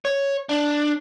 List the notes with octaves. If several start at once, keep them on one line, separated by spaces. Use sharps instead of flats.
C#5
D4